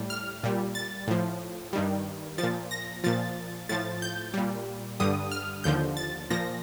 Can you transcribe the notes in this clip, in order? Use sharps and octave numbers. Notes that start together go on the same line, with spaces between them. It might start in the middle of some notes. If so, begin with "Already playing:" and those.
Already playing: A2 G3
F6
A#2 G3
A6
A2 F3
G2 D#3 G3
F3 A6
A#2
A#6
A#2 F3 A6
A2 F3 A6
G6
A#2 G3
G2 D3 G3 D#6
F6
D#2 D3 F3 G6
A6
A#2 F3 A#6